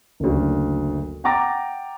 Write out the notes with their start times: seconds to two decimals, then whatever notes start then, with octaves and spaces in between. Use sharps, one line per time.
0.20 F#1 D2
1.24 F#5 G5 A#5 D6 A6 A#6